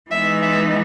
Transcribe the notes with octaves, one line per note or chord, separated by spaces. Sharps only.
E3 G#3 B3 D#4 E5
E5